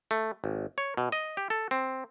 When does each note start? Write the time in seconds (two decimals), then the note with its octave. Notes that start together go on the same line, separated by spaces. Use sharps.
0.11 A3
0.44 G#1
0.78 C#5
0.97 B2
1.12 D#5
1.37 G4
1.50 A4
1.71 C4